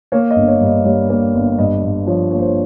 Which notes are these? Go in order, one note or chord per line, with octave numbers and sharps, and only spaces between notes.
A#3 C#5
D#5
G1
C#5
G2
D#5
G3 C#5
A#3
G1
G2 D#5
G2
F3 C#5
A#3 C#5
C5
C#5